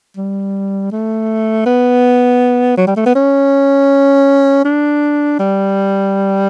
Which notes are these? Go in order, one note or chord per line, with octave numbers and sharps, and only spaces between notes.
G3
A3
B3
F#3
G3
A3
B3
C#4
D4
G3